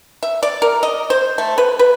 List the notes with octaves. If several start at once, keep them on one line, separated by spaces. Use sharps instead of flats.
E5
D5
A#4
D#5
C5
A3
B4
B4